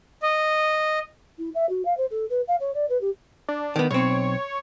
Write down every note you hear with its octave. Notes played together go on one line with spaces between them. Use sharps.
D#5
E4
E5
F#4
F5
C5
A4
B4
F5
C#5
D5
B4
G4
D4
D#3 B3
B1 C4 C#5